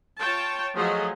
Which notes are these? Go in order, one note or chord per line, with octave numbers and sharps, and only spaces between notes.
F4 C#5 G5 A5
F3 F#3 A3 F#4 G#4 D#5